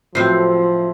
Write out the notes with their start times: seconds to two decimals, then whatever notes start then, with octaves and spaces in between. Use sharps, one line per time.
0.15 A2 F3 F#3 C4 E4 C7